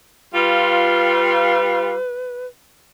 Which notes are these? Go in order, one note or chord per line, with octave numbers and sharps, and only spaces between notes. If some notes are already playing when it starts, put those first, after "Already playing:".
G3 F4 B4